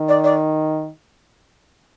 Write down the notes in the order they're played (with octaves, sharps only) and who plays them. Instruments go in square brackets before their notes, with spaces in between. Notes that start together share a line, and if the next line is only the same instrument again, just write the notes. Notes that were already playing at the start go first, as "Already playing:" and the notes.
Already playing: [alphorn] D#3
[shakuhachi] D5
D5